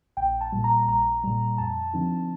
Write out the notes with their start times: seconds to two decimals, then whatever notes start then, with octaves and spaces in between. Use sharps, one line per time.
0.17 A#1 G5
0.41 A5
0.52 A#2 G3
0.64 A#5
0.88 A#1 A#5
1.24 A#2 G3
1.58 F2 A5
1.94 D3 F3 C4 D#4